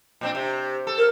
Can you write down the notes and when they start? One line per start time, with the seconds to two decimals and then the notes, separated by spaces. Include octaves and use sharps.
0.21 A#2 C4 D4
0.35 C3
0.87 A4
0.98 A#4